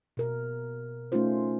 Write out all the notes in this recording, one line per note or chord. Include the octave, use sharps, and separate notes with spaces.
B2 A#4
A3 C#4 D#4 F4 C5